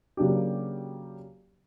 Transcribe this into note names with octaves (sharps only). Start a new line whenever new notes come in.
C#3 F#3 A#3 D4 G4